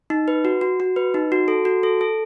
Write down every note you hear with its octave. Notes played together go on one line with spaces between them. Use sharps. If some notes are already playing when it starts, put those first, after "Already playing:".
D#4
B4
F#4
F#4
F#4
B4
D#4
F#4
A4
F#4
A4
A4